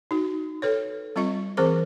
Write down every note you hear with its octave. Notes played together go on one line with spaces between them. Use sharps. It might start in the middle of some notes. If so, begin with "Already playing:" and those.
D#4 F#4
A4 B4 C#5
G3 C4 F4 D#5 C#6
E3 C4 G#4 A#4 C5 D6